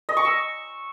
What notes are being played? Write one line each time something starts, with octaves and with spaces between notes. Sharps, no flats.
D#5
C#6
E6